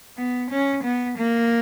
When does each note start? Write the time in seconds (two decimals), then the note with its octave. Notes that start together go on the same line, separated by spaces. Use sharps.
0.18 B3
0.51 C#4
0.84 B3
1.18 A#3